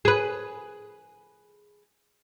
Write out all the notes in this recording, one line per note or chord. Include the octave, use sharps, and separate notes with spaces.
G#4 B4